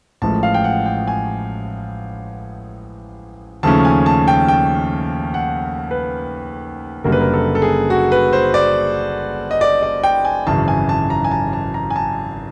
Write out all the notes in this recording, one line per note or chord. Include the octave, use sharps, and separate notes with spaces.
A1 A2 F3 G#3 A5
F5
G5
F#5
G5
G#5
D#2 C#3 F3 A3 C#4 A5
G#5
A5
G5
G5
F#5
B4
F#1 F#2 D3 G3 A#3 A#4
B4
A#4
A4
A4
G#4
F#4
B4
C5
D5
D#5
D5
D5
G5
G#5
G#1 F#2 C#3 E3 A5
G#5
A5
A#5
G#5
A5
A5
A#5
G#5
A5